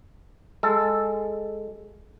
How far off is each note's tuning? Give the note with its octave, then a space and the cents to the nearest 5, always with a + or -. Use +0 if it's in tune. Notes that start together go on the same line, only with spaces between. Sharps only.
G#3 +0 A4 +0